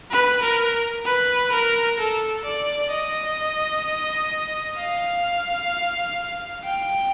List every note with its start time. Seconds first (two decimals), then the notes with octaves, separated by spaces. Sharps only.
0.11 B4
0.42 A#4
1.06 B4
1.52 A#4
1.99 A4
2.45 D5
2.91 D#5
4.78 F5
6.65 G5